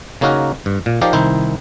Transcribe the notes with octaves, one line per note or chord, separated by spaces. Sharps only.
C#3 A#3 C#4 D#4 F#4 A#4
G2
A#2
F3 D#4 G4 A#4 D5 F5
C2 D#3 D#4 E4 C5